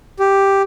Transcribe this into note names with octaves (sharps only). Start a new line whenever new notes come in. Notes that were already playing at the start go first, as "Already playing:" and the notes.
G4